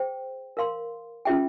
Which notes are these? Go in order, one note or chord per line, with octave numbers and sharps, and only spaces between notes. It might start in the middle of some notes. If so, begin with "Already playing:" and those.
Already playing: G#4 C5 G5
A#4 F5 C6
C#4 F4 G#4 E5 G5